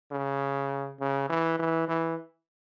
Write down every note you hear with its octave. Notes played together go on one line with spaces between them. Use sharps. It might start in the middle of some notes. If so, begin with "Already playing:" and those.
C#3
C#3
E3
E3
E3